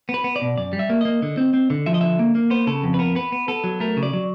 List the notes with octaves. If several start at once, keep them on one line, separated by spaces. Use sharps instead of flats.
B3
B4
B3
D5
B2
F#2 D5
G3
E5
A#3
A#3 D#5
D3
C4
C4
D3
F3 E5
D#5
D3 E5
A#3
A#3
B3 C5
C#3 A4
F2
B4
B3 A#4
B3 B4
B3
B3 A4
F#3
A3 A#4
C#3
D5
F#3